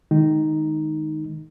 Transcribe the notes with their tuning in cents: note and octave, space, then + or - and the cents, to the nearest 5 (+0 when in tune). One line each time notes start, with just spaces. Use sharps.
D#3 +0 G#3 +25 D#4 +0